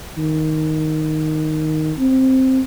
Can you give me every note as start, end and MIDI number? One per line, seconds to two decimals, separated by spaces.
0.17 1.93 51
1.99 2.61 60